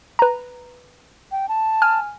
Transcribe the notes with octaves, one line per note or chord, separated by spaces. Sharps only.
B4 A#5
G5
A5
G#5 F6